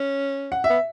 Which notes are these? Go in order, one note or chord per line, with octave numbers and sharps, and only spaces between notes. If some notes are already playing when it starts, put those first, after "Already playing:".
Already playing: C#4
F#5
E5
B3